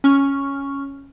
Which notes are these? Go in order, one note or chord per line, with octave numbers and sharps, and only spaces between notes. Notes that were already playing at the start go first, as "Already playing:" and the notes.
C#4 C#6 F6